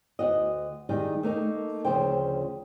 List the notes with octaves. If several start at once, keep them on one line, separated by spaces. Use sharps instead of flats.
D2 D#3 F#4 D#5
D#3 G3 G#3 D#4
A3 A#3 D#4
D2 A#2 C#3 F3 C5 G5